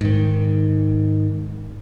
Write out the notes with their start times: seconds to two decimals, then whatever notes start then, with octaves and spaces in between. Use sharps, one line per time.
0.01 G#2 D#3